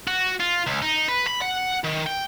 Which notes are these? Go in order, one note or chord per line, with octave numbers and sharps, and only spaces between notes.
F#4
F4
C#2
D#4
B4
B5
F#5
D#3
G5